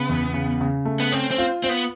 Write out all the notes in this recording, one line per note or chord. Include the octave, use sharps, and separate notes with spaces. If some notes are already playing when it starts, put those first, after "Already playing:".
Already playing: C#3 B3
E2
C#3
C#3
A3
B3
C4 C#4
C4
F4
C4 F4
B3